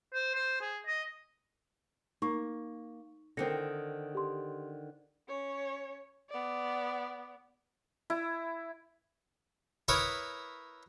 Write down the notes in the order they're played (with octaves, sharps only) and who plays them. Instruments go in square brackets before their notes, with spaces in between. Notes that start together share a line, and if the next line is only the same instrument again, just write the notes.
[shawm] C5
C5
G#4
D#5
[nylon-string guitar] A#3 [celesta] D#4 C#6
[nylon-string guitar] D3 D#3 C4 [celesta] A#6 C#7
[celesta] G4 C6
[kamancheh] C#4 C#5
B3 D5
[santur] E4
[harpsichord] E4 A#4 B4 C#5 D#6